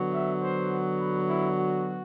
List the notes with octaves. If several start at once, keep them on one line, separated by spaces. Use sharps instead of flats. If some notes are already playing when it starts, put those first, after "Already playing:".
Already playing: D3 F#3 B3
E5
C5
B4
E4
F#4